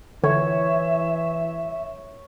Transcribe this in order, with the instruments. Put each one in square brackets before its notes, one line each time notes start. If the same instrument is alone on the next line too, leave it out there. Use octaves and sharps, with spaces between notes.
[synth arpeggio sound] D3 [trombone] E3 [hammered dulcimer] C#5 [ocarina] E5